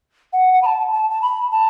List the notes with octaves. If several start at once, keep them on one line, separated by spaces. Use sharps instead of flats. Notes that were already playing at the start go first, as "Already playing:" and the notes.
F#5
F#5
B5
A5
A5
A5
B5
A5